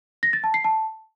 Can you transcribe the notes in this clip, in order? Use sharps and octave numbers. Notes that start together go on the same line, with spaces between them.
A#6
A6
A5
C7
A5